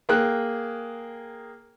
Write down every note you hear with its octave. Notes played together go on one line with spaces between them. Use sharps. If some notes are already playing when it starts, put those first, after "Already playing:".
A#3 G#4 G5 F#6